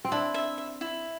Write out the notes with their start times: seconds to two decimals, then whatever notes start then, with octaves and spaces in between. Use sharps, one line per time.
0.05 C4
0.12 D4 E4
0.34 E5
0.58 E5
0.81 E4